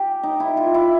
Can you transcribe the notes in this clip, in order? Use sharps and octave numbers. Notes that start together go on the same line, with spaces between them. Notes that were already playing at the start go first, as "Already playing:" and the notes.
Already playing: G4
D#4
E4
F4
E4